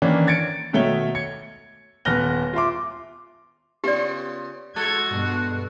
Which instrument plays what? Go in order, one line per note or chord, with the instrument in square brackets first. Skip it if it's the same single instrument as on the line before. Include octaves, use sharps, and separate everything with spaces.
[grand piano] D#3 E3 A#3 C#4 D4
G#6 A6 C#7 D7
B2 D#3 A3 C#5 E5 G7
G#6 C#7
D#1 B3 B4 F6 A#6 G7
F4 E5 C6 D6
[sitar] C#3 B3 F4 [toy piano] G4 D5
[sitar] G#3 A4 [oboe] F#4 [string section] G#6
[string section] G2 B2